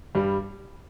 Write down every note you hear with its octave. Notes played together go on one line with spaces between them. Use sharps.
G2 G3